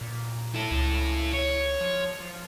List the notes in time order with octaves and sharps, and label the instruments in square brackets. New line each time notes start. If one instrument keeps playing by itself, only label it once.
[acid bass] A#2
[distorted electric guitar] E4 A4
[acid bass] C#2
[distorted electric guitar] C#5
[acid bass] F3
F3